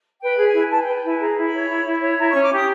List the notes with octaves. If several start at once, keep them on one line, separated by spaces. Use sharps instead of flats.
B4 G5
G#4
G#5
E4
B4 A5
G5
B4
G5
E4 G#5
G#4 A#5
E4
B5
C#5
E4
E4
C#5
E4 A#5
C#6
C#4
D6
G4 D#6